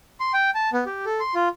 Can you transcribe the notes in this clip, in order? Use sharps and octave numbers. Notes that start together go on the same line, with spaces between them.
C6
G5
A5
B3
G4
A4
C6
F4